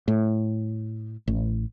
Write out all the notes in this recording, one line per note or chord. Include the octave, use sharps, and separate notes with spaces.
A2
A1